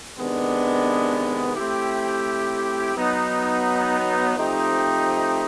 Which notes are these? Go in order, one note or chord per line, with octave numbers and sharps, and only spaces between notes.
C3 D#3 G#3 B3 D4
A3 C4 E4 G4
F#3 B3 D#4
F3 A3 C4 D#4 G4